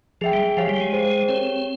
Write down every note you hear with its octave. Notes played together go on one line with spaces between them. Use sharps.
F3 G#4 E5 G5
G3
F3 G4 C#5 F5 G#5
G3
G#3
G#4 C5 G5
C4 G4 A#4 C#5 G5